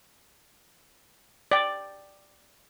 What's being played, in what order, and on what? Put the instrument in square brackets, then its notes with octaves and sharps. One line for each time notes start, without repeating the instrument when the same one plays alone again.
[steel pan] D5 G5